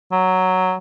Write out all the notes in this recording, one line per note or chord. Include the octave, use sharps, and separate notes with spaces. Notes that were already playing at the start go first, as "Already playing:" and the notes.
F#3